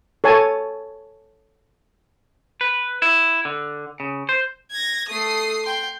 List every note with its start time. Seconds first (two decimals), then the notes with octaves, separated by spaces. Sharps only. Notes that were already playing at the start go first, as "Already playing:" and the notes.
0.24 A4 C#5 G#5 A5
2.61 B4
3.02 E4
3.45 D3
4.00 C#3
4.29 C5
4.71 G#6 A#6
5.09 A3 A4 D#6 C7
5.66 G5 C6